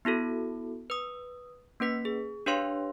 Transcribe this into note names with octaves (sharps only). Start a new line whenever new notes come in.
B3 E4 F#4 A4
B4 D#6
A#3 C#4 B4 B6
G#4
D4 G4 B4 C#5 F5 C6